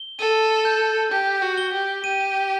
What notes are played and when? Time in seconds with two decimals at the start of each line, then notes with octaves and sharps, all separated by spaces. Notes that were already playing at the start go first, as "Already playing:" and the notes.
Already playing: G7
0.19 A4 D#7
0.65 G6
1.11 G4 G6
1.42 F#4
1.58 G7
1.73 G4
2.04 G4 D#7